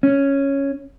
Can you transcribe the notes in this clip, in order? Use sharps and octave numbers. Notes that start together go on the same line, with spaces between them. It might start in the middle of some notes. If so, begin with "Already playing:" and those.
C#4